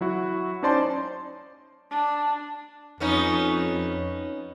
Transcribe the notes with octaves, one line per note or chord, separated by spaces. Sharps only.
F#3 E4 F#4
C#4 D#4 C5 D5 A5 C6
D4
F2 B3 C#4 D#4